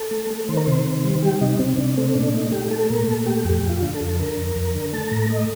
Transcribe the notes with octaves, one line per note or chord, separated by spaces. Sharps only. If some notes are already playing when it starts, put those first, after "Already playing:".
Already playing: A4
A3
A3
D#3 C5
A#4
C3 C5
D#3
G3
G3 G4
C3 D#4
C3 C4
C3 D4
A3 C4
A#2 D4
A3 D#4
A3 G4
A3 A4
A#2 A#4
A#2 A4
A3 G4
F2 G4
F2
F4
D3
A4
F2
D3 A#4
F2
F2
D3
A3 A5
A2 A#5
A3 D#5